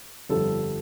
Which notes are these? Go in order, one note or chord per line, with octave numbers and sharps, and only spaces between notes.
G1 F2 D3 G3 A4